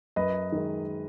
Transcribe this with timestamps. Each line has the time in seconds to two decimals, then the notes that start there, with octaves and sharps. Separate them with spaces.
0.16 F#2 B4 D#5
0.52 D#3 G#3